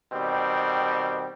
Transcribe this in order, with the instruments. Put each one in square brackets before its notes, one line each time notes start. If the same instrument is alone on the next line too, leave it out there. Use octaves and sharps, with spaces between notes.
[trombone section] B2 D#3 G3 C4